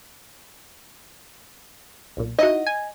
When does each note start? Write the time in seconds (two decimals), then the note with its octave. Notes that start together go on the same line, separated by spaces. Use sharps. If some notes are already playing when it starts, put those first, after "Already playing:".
2.17 B1 A#2
2.39 D#4 E4 F#4 D#5
2.67 G#5